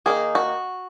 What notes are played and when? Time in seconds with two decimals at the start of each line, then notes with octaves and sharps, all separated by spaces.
0.06 D#3 A#3 D#4 G#4
0.35 F#4